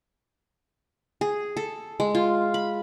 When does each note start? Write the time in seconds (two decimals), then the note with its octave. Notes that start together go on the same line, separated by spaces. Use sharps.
1.21 G#4
1.57 A4
2.00 G#3
2.15 F4
2.54 B5